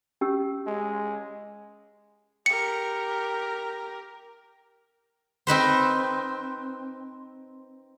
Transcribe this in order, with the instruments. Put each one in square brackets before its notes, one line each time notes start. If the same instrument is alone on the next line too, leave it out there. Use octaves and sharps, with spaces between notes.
[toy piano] C#4 G4 E6
[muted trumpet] G#3
[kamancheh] G4 A#4 [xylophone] C#7
[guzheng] C4 D#4 B4 C5